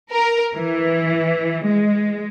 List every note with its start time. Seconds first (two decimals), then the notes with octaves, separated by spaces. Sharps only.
0.11 A#4
0.54 E3
1.65 G#3